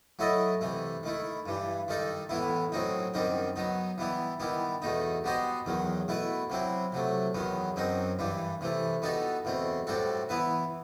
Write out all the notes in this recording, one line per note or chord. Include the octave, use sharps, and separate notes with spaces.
F#3 A3 E4 A4 D#5
C3 E3 A3
D#3 A3 E4
G2 E3 G3
D#3 G3 D#4 A4
A2 E3 B3 E4
A2 F#3 C4 D#4
F#2 D#3 G3 C4 D#4
F#3 B3 D#4
E3 G3 B3 E4
D#3 G3 B3 E4
E2 B2 A3 D#4
G3 B3 F#4 C5 D#5
E2 D#3 F#3
B2 A3 E4 B4
C3 F#3 C4 E4
C3 F#3 A3
E2 D#3 F#3 B3
F#2 F#3 C4 D#4
G2 E3 G3
C3 E3 A3
G3 B3 D#4 F#4 A4
E2 B2 A3 C4
A2 G3 C4 F#4 A4
E3 B3 E4 B4